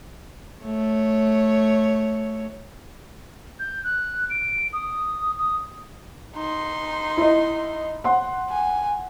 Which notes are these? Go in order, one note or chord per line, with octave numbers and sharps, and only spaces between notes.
A3 C#5
G6
F#6
D7
D#6
D#6
D#4 C6
E4 D#5
F#5 C6
G#5